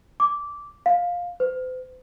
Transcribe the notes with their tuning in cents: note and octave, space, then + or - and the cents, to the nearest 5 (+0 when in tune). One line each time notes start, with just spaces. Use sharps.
D6 -15
F5 +15
C5 -45